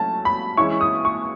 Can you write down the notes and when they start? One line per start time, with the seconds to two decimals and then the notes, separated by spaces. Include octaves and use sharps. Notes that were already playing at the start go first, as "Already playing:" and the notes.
Already playing: F#3 A3 C#4 E4 A5
0.25 B5
0.57 E3 G#3 C#4 E4 C#6
0.81 D#6
1.05 C#6